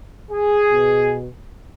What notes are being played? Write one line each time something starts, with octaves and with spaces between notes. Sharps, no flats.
G#4
B2